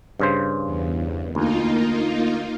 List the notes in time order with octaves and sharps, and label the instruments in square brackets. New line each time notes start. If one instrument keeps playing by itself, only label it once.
[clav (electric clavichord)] G2 C#3 C5
[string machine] E2
[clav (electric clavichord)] D2 [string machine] A#3 D#4 F4